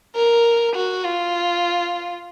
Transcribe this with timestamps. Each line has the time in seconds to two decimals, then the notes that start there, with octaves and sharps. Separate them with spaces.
0.16 A#4
0.76 F#4
1.05 F4